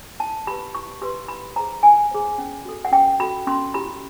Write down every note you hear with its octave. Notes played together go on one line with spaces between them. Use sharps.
E4 A5
G4 B4 B5
E4 C#6
G4 B4 C6
E4 B5
G#4 C5 A#5
E4 G#5
G#4 C5
C#4
F#4 A4
F#5
C#4 G5
F#4 A4 B5
C#4 C6
E4 G4 B5